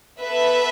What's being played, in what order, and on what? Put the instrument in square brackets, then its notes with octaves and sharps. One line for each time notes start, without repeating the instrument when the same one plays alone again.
[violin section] B3 A4 B4 E5